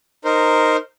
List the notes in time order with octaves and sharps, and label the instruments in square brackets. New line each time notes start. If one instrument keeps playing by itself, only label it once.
[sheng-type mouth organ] D#4 A#4 C5